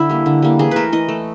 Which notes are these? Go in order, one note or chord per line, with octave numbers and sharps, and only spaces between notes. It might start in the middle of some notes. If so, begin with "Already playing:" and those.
Already playing: D3 E4
G3 A#3
D3
G3 A#3
E3 G#4
A3 A#4 B4
E3 D#5
A3